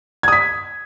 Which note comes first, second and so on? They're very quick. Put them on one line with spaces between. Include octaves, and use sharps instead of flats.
G#6 D#6 B6